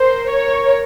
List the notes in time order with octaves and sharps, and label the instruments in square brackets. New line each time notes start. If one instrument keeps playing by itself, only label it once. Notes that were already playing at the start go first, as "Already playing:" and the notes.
Already playing: [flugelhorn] A#4 [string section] C5
[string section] C#5